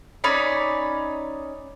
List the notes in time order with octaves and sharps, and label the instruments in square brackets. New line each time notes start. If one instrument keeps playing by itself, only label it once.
[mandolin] C#4 D#4 D5 B5